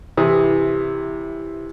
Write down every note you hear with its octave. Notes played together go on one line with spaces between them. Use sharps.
C3 E3 D#6